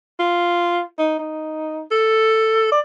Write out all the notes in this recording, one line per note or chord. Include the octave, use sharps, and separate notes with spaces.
F4
D#4
D#4
A4
D5